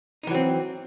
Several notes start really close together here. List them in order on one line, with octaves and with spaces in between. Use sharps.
D#4 E3 F#3 C4